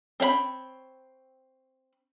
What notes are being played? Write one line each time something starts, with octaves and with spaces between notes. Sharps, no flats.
C4 C#5 F5 B5